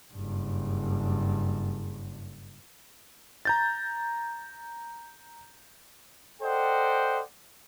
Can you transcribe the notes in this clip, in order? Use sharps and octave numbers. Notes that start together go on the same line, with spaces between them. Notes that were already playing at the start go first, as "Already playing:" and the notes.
F#1 G2
A#5 G6 A6
A4 C5 D5 D#5 F#5 G5